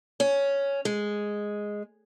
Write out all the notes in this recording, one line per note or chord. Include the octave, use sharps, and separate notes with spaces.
C#4
G#3